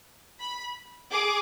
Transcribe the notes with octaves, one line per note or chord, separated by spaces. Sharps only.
B5
G#4 D6